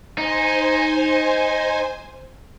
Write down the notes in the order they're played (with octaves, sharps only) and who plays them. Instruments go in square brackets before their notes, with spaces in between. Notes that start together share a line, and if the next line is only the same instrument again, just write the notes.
[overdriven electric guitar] D#4 [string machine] C5 G#5